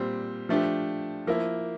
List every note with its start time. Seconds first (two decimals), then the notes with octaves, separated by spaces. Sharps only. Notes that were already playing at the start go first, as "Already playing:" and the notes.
Already playing: A#2 G3 C4
0.49 F3 A3 D4 G4
1.27 F3 A#3 E4